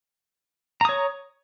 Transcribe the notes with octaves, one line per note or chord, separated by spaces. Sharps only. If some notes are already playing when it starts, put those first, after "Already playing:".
C#5 A#5 D#6